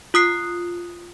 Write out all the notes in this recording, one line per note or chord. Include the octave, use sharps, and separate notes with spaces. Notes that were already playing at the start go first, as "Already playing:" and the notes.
F4 D#6 F#6 C7